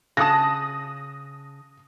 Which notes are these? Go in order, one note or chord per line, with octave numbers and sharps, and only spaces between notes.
C#3 A5 D#6 F#6 A#6